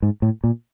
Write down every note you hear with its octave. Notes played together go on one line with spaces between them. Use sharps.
G#2
A2
A#2